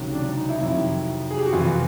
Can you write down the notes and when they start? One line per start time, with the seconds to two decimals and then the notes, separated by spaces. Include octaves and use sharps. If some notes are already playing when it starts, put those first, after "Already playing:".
Already playing: C#2 C3 D#3 F#3
0.15 D4
0.38 D#4
0.49 E4
0.61 F2 C3 D#3 F#3 E4
1.30 G#4
1.38 G4
1.46 F#4
1.53 F2 C3 E3 F4